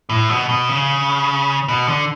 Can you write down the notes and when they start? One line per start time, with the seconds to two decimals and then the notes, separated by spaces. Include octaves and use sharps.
0.09 A2
0.29 B2
0.49 B2
0.69 C#3
1.68 B2
1.88 D3